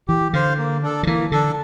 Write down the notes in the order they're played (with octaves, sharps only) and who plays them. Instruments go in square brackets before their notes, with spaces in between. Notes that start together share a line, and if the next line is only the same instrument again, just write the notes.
[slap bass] E3 [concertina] G4
[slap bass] D3 [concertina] C5 F5
[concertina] A#3
D4 A4
[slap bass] D3
[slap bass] E3 [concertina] A#3
[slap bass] D3 [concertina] D4 A4